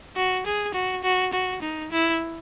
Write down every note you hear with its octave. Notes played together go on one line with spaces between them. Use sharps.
F#4
G#4
F#4
F#4
F#4
D#4
E4